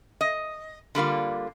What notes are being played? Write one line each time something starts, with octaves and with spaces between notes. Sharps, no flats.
D#5
D3 G3 A#3 F4